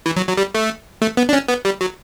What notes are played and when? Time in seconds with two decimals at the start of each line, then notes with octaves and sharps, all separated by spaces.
0.06 E3
0.17 F#3
0.28 F#3
0.37 G3
0.55 A3
1.02 A3
1.17 B3
1.29 D4
1.33 C#4
1.48 B3
1.65 G3
1.81 F#3